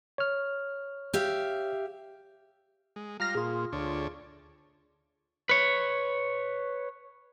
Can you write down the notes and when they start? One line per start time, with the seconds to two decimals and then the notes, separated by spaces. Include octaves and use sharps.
0.18 C#5 F6
1.14 G4 E5 F5
2.96 G#3
3.20 G3 F4 F5 A#5 F6 A#6
3.35 A#2 F4 G#4
3.72 D2 D4 C#5
5.49 B4 C#5